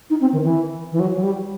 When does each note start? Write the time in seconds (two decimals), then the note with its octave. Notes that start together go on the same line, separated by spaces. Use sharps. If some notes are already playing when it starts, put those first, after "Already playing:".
0.10 D#4
0.21 C4
0.32 D#3
0.43 E3
0.92 E3
0.99 F#3
1.15 F#3
1.23 G3